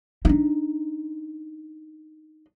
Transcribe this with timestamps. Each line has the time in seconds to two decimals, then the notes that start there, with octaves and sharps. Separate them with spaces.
0.25 D4 D#4